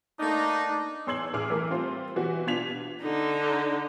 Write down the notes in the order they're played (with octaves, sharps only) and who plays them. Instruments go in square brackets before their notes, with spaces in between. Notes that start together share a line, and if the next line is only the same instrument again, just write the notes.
[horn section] A3 A#3 D#4 [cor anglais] D4
[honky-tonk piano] E2 C#5 C6 E6 G#6 F#7
A1 E2 G#4 D6 F6
E3 A3 A#4
G3 C4 F4 C5
B2 E3 F#4 G4
B2 D4 F4 G#6 B6 F7
[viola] D3 D#4